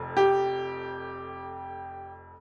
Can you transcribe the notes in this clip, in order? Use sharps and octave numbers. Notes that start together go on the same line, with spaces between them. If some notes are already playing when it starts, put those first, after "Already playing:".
Already playing: F1 F2
G4